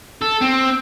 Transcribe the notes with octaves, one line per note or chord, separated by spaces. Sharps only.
A4
C4